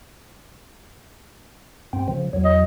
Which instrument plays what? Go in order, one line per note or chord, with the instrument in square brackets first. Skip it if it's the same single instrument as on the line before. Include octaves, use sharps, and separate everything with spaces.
[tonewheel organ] G2 C4
C#3 F3
E2 F#3
[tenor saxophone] D#5